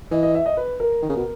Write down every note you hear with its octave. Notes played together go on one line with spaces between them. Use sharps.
E3 D#5
D#5
E5
D#5
B4
A#4
D#3
C#3
B2